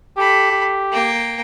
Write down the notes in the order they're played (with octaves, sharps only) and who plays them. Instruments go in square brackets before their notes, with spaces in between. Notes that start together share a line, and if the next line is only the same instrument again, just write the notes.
[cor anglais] G4 [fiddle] A4 B5
[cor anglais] G4
[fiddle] A#3 G5